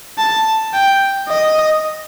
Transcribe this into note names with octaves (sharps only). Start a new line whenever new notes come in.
A5
G5
D#5